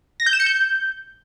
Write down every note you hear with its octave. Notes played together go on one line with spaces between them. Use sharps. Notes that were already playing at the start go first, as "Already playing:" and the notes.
A#6
G6
E7
C#7
G6